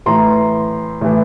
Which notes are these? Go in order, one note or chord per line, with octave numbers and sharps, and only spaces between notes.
A2 E3 A#5 C6
A2 E3